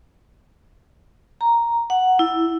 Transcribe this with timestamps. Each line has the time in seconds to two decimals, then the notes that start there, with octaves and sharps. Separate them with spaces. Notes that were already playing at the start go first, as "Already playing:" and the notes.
1.41 A#5
1.90 F#5
2.19 E4